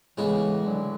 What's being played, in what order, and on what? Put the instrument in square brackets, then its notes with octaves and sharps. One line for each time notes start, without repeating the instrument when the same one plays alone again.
[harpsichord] A2 G#3 B3 [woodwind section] C#3 E3
[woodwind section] D3 F#3